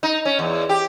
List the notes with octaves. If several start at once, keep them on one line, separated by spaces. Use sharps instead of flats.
D#4
C#4
E2
G4